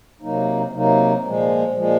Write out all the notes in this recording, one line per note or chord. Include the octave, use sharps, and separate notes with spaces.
C3 F#3 A#3 D#4
C3 F#3 A#3 D#4
A#2 F3 G#3
A#2 F3 G#3